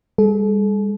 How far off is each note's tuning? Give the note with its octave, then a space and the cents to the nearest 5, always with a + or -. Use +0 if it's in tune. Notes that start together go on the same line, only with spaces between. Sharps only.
G3 +40 A4 -40